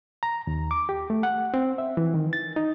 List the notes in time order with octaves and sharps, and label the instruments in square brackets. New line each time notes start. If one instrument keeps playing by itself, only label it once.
[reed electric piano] A#5
D#2
D6
G4
A3
F#5
C4
E5
E3
D#3
A6
D#4